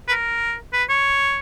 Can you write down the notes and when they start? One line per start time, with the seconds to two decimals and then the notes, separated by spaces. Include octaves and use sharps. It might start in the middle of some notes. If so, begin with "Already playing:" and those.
0.08 B4
0.11 A#4
0.73 B4
0.89 C#5